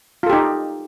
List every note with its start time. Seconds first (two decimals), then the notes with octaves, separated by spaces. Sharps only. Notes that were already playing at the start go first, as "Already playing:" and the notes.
0.23 F4
0.26 A4
0.30 G4
0.33 D#4